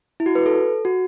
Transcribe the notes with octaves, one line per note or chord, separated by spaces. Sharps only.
E4
F#4
B4
A4
F#4